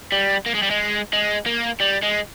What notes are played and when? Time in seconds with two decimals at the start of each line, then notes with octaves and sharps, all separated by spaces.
0.12 G3
0.46 A#3
0.55 G#3
0.62 G3
0.70 G#3
1.13 G#3
1.47 A#3
1.81 G3
2.03 G#3